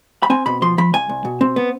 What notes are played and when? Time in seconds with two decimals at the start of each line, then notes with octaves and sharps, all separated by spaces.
0.23 B5
0.30 C4 G#5
0.46 B2 B5
0.62 F3 C6
0.78 F3 B5
0.93 C2 G#5
1.09 C2
1.25 B2
1.41 C4
1.56 B3